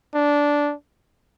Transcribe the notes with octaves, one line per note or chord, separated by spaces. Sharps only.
D4